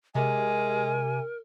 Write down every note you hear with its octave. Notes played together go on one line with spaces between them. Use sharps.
C3 G#3 A#4 G#5